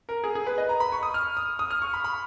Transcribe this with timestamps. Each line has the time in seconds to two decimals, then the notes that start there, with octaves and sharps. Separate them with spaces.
0.09 A#4
0.24 G#4
0.35 G#4
0.47 B4
0.58 D#5
0.69 A#5
0.80 B5
0.92 C#6
1.03 D#6
1.14 F6
1.37 D#6
1.59 D#6
1.71 F6
1.82 C#6
1.93 B5
2.04 B5